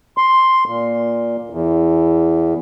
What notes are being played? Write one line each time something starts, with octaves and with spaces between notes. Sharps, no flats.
C6
A#2
E2